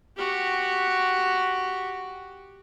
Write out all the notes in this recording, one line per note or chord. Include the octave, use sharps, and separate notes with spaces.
F#4 G4